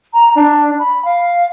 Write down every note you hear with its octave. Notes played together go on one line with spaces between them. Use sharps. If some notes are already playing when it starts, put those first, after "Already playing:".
A#5
D4
B5
F5